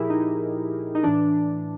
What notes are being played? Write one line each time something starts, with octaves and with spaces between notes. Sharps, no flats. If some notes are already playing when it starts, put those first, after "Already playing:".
Already playing: A#2 F3 E4 G4 G#4 A#4
D#4
D#4
A2 E3 D4